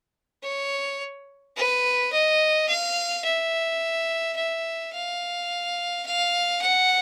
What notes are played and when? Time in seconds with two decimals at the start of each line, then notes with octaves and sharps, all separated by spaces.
0.43 C#5
1.56 B4
2.12 D#5
2.68 F5
3.25 E5
4.36 E5
4.93 F5
6.06 F5
6.61 F#5